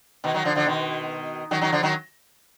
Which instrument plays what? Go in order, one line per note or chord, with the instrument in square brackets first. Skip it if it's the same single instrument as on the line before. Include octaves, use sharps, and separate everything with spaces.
[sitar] B2 D#3
D#3 F#3
D3 F3
D3 F3
B2 D#3
D#3 F#3
D#3 F#3
D3 F3
D#3 F#3